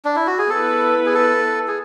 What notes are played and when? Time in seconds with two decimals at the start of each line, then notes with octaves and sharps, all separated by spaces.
0.05 D4
0.16 E4
0.27 F#4
0.39 G#4
0.50 B3 E4 A4 B4
1.06 G#4
1.14 A4
1.68 G#4